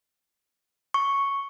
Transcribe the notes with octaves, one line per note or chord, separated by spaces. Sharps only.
C#6